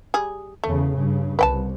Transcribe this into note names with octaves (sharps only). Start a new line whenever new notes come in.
G3 G#4
E2 C#3 A3
G2 C#3
C2 B4 G5 A5